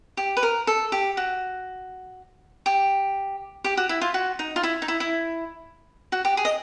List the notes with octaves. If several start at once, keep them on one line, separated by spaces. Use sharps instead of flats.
G4
B4
A#4
A4
G4
F#4
G4
G4
F#4
E4
F4
F#4
D#4
F4
E4
D#4
E4
E4
F#4
G4
G#4
D#5